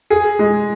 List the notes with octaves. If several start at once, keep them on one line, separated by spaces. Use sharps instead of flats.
G#4
G#3